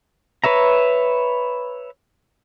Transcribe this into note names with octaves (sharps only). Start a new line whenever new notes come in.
B4 C#5 E5 A#5